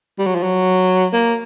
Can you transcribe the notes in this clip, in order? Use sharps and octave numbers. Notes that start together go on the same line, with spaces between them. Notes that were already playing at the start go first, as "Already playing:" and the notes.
G3
F#3
F3
F#3
A#3